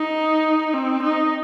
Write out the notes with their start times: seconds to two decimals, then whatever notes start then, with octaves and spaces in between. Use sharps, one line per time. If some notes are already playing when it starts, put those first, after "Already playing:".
Already playing: D#4
0.73 C4
1.02 D#4